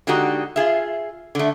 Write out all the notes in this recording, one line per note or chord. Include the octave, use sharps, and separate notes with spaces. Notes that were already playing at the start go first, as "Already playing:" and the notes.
D3 G#3 D#4 F#4 G4
F4 G#4 E5
D3 A3